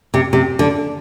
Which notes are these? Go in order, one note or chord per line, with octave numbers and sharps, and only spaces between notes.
C3
C3
D3